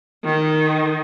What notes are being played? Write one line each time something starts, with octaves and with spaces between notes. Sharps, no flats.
D#3